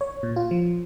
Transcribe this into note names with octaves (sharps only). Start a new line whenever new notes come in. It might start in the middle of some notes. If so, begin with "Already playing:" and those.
C#5
A#2
F4
F3